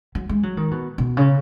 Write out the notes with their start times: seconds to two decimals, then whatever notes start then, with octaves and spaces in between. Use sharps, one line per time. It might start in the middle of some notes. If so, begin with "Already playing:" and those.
0.15 F#3
0.29 G#3
0.43 F#3
0.57 D#3
0.71 B2
0.98 B2
1.17 C#3